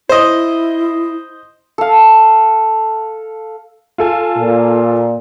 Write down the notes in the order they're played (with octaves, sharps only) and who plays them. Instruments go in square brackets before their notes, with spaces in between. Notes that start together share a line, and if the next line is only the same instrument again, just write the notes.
[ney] E4 [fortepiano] C5 D#5
[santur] A4 F5
[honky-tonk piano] F4 A4 G#5
[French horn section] A#2